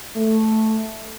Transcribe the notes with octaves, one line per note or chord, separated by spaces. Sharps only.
A3